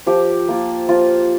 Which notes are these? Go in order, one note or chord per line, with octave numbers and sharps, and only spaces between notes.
F3 G4
A#3 F4
F3 F4